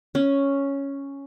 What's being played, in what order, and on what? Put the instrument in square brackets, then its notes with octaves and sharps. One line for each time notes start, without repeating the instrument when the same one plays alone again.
[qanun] C#4